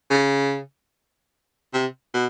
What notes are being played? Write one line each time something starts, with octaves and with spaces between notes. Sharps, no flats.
C#3
C3
B2